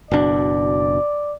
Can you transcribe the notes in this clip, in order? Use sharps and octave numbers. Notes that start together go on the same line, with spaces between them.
F#1 B2 D4 D5